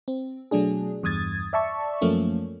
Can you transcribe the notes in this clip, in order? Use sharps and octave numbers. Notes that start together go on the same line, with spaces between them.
C4
B2 F#3 A3 D4 G#4
E2 G2 D#6 G#6 A6
D5 E5 A5 C#6
F#2 F3 A3 A#3 C#4